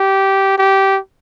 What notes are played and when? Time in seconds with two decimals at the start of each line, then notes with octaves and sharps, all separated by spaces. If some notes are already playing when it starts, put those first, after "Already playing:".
Already playing: G4
0.58 G4